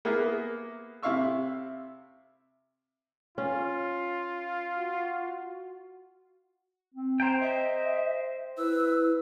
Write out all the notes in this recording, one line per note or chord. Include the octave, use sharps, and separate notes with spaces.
A#3 B3 E4 G#4 A#4
C3 E4 E5 F5 C#6 E6
C#4 F4
F#4
C4
C5 G5 A#5
D#5 E5
E4 B4 E6